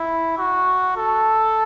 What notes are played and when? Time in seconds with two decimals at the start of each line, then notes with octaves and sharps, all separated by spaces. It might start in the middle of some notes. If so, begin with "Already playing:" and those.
Already playing: E4
0.38 F#4
0.97 A4